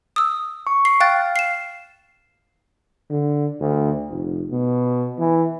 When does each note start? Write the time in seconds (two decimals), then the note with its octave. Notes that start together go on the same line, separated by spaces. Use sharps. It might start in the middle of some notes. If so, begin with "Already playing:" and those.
0.16 D#6 E6
0.67 C#6
0.85 C7
1.00 F5 G5 F#6 A6
1.36 C7 E7
3.10 D3
3.60 D2
4.09 F1
4.50 B2
5.18 E3